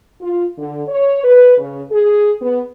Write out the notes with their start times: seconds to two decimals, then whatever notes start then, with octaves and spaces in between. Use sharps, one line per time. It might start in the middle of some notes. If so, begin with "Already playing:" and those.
0.21 F4
0.58 D3
0.88 C#5
1.24 B4
1.58 C#3
1.91 G#4
2.42 B3